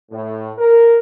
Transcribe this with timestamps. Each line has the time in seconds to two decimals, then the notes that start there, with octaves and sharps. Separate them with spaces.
0.11 A2
0.58 A#4